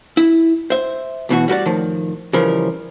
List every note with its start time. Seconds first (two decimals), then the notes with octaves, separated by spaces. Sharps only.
0.17 E4
0.70 C5 E5
1.29 B1 B2 E3 F#4
1.48 G3 F#4 A#4 D5
1.66 A2 D#3 F3
2.33 C#3 E3 F3 G3 A#4